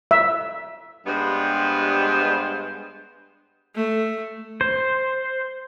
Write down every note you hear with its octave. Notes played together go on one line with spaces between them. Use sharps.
E5
G2 G3 G#3 B3 C5
A3
C5